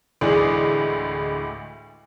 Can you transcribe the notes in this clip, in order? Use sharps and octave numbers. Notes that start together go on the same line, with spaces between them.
D2 A2 E3 G#3 G#4 D5